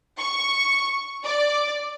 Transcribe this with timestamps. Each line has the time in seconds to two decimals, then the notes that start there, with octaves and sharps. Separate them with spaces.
0.18 C#6
1.23 D5